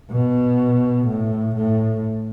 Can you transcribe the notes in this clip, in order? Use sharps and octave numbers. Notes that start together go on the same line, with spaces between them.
B2
A2
A2